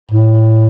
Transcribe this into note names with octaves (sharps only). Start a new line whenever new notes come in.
A2